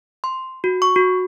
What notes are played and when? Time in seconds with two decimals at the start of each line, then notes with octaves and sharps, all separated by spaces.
0.24 C6
0.64 F#4
0.82 C#6
0.96 F#4